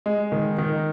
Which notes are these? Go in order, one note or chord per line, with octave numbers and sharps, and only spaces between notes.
G#3
D#3
D#3